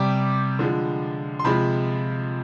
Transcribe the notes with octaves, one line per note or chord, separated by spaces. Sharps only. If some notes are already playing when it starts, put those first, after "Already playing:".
Already playing: C3 G3 D6
D3 F3 G#3
C6
C3 F3 G#3 B5